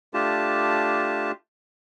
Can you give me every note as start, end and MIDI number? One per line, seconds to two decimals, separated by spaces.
0.14 1.32 57
0.14 1.32 62
0.14 1.32 65
0.14 1.32 67
0.14 1.32 81